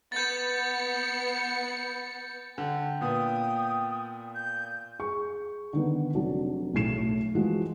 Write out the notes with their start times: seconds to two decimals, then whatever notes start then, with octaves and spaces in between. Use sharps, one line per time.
0.12 B3 G6 A6 C#7
2.58 D3 G5
3.01 A#2 B3 D#6
4.35 G6
4.99 G#4 C#6
5.73 D3 D#3 B3
6.14 F1 F#3 D4
6.74 B1 A2 A3 C7 E7
7.35 E3 F3 G#3 F#4